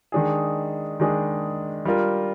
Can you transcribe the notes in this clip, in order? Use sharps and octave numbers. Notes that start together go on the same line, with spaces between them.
D#3 G#3 D4 G#4
D#3 G#3 D4 G#4
G3 D4 F4 A#4